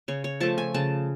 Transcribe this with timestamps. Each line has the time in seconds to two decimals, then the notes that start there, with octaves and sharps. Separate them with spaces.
0.08 C#3 C#5
0.24 C#5
0.40 F3 A3 A5
0.58 G#5
0.74 C#3 A5